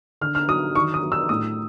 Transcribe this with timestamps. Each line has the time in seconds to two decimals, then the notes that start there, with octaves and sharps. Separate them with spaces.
0.21 D3 F6
0.35 F6
0.48 F#3 D#6
0.75 D#3 C#6
0.94 D#6
1.02 F#3
1.12 E6
1.29 A2 D#6